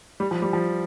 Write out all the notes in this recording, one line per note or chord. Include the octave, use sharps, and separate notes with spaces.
G3
F3
G3
F3